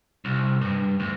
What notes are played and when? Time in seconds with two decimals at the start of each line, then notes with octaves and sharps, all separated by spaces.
0.25 C2
0.61 G2
1.00 D2